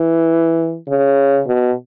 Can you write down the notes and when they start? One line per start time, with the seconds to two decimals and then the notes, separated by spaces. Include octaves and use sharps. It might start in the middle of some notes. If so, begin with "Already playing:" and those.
Already playing: E3
0.89 C#3
1.46 B2